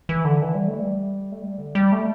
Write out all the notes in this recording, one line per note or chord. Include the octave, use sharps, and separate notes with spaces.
E3
D3
E3
G3
A3
G3
A3
G3
D3
G3
A3